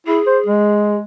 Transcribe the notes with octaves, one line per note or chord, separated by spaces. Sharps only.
E4 G#4
C5
G#3